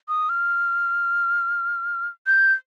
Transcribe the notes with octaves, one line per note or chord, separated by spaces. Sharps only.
D#6
F6
G6